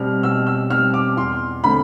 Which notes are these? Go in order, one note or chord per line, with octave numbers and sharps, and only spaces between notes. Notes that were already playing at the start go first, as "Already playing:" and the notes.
Already playing: B2 G3 C4 F6
B2 E6
E6
G3 C4 F6
D6
E2 C6
D3 A3 C4 B5